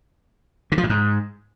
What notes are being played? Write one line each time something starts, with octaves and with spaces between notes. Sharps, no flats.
D3
F3
A2
G#2